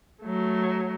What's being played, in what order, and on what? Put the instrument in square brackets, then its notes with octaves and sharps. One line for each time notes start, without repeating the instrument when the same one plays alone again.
[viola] F#3 A3